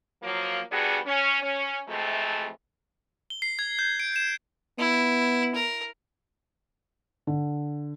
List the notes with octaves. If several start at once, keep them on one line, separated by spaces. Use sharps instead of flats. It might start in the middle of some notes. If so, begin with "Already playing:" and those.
F3 F#3 A#3
F3 G3 B3 D4 F#4 G#4
C#4
C#4
C3 E3 F3 G#3 A3
G7
C7
G#6
G6
D7
E7
B3 E4
A#4
D3